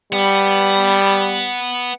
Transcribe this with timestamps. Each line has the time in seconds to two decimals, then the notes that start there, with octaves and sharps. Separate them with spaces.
0.13 G3 B3